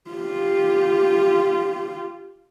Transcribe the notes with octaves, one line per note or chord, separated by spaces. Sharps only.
F4 G4